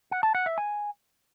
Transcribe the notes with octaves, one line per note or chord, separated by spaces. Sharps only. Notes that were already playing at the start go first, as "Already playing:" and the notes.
F#5
A5
F#5
E5
G#5